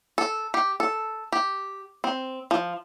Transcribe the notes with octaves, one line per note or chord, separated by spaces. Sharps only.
A4
G4
A4
G4
C4
F3